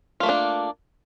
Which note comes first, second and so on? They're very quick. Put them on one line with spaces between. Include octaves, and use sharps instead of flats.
F4 A3 A#3 D4